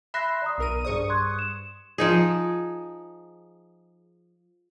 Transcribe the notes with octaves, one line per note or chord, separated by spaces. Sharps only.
E5 B5 C6 F#6 A#6
D5 A#5 D#6
B1 A#4 D#7
G2 G#4 C5 D5 C#6 D#6
C6 F#6 G#6
E7
F3 D#4 G#4